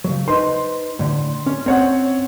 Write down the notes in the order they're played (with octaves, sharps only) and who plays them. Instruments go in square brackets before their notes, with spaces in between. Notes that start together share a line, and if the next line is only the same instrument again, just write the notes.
[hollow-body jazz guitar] C#3 F#3
[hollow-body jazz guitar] D#4 B4 C5 [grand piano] C6
[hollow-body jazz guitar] A2 D3
C#4
[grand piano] C4 C#5 F#5